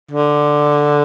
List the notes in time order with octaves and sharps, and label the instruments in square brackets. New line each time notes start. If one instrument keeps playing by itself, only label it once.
[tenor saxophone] D3